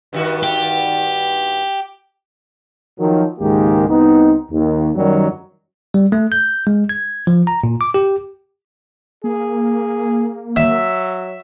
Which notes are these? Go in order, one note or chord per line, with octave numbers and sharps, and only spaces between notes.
G2 D#3 F#4
G4
D#3 F3 F#3
C#2 G#2 D#3 G#3 A#3 G4
C2 B3 C4 D#4
D#2
F#2 D#3 F#3 G3
G3
A3
G6
G#3
G#6
F3
A#5
A#2
D6
G4
A#3 G#4
F#3 E5